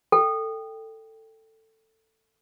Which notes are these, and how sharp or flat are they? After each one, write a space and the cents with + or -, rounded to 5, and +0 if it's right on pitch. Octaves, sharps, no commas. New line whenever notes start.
A4 +15 G5 +0